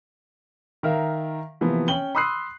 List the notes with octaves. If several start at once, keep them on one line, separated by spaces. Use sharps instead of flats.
D#3 A#4 E5 F5
C3 E3 F3 A#3 B3
C#4 G5 F#7 G7
B5 C6 D#6 E6 F#6 C7